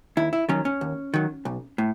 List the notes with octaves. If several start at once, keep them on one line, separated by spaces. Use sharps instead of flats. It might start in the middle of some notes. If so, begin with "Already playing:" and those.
D#2 E4
E4
D#3 F#3 C#4
C#4
D#2
D#3 F#3
B1
A2